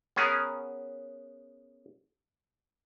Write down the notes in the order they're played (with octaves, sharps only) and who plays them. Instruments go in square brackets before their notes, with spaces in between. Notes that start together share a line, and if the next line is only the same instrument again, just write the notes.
[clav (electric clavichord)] B3 C#4 G#4 A#4